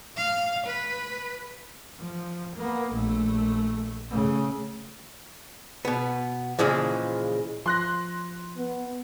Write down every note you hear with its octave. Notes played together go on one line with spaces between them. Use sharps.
F5
B4
F3
A#3 B3
A#1 A3
C#3 A3
B2 B3
A#2 C#3 E3 F3 G#3
F3 C6 F#6 A#6
B3